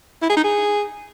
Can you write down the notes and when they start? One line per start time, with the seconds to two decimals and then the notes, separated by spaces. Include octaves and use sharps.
0.22 E4
0.29 G#4
0.37 D#4
0.44 G#4